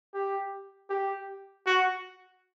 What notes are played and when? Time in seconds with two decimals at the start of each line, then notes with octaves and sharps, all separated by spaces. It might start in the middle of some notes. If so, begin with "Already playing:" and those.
0.14 G4
0.90 G4
1.67 F#4